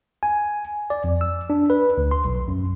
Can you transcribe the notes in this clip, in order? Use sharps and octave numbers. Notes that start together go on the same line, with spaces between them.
G#5
D5
F2
E6
D4
B4
D2
C6
B1
F#2